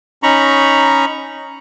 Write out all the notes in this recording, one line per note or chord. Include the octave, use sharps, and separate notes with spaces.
C#4 D#4 A#5 B5 C#6